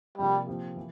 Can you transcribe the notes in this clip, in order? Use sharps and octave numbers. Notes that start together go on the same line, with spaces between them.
C3 F3 G3 A#3 D4
A#2 F3 C4 G4
E3